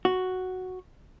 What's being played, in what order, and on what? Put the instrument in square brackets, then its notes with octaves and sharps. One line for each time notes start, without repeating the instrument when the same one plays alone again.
[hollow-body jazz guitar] F#4